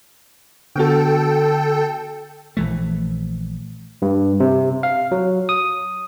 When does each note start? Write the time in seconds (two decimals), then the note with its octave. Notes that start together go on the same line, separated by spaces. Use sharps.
0.76 D3 B3 F#4 A4 G5
2.57 A#1 E3 A3
4.02 G2
4.40 C3
4.83 F5
5.11 F#3
5.49 D#6